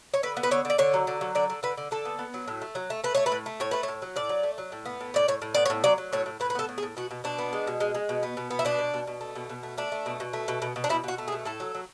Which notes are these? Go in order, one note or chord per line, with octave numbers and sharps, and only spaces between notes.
C#5
D3 B4
B3
B4
D3 C#5
D3
D5
D3 C#5
F#3
D3
F#3
D3 D5
D3
D3 B4
D3
D3 A4
B3
B3
F#3
A2
A3
F#3
A3
A3 B4
A3 C#5
B4
A2
A3
A2 C#5
A3 B4
C#5
A2
F#3
A2 D5
F#3
A3
F#3
A2
B3
A2
A2 D5
A2 C#5
A2
B3 D5
C#5
A2
F#3 D5
F#3
A2 C#5
A2
A2 B4
B4
B3 A4
A2
G#4
A2
B2 F#4
B2
B2 D4
B3
G#3
B2
G#3
G#3
B2
B3
B2
B3
E4
B2 D4
B2
B2
B2
A3
B2
B2
A3
A3 D4
A3
B2
B2
A3
B2
B2
B2
D4
B2 E4
B2 F#4
A3
G#4
B2
A2 A4
F#3
F#3